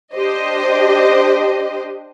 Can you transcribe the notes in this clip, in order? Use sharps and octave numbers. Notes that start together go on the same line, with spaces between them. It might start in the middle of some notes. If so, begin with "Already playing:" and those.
D4 G4 C5 D#5